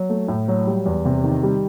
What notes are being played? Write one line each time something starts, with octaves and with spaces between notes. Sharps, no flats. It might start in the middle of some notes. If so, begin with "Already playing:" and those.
Already playing: F#3
A3
A2
F#3
G3
E2
C3
D#3
G3